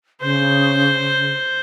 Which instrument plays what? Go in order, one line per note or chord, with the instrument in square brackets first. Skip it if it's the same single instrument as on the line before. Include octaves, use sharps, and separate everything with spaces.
[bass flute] C#3 [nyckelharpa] C5